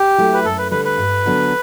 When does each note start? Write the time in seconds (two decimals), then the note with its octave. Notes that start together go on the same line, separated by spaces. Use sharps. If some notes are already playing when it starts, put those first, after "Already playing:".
Already playing: G4
0.18 F#3 A3 E4
0.34 B4
0.45 F#2 A4
0.58 B4
0.71 D3 G3 B4
0.85 B4
0.98 G2
1.26 D3 F#3 B3 D4